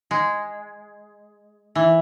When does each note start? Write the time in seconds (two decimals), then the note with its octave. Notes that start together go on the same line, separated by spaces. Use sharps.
0.11 G#3
1.75 E3